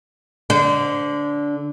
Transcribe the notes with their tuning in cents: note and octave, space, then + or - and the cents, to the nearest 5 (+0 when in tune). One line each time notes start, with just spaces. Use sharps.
D3 -15 C5 -30